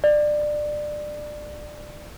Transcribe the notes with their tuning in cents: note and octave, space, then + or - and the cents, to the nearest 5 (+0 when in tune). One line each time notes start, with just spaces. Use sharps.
D5 +20